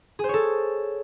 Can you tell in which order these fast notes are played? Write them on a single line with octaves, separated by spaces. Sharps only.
G#4 C5 C#5 A4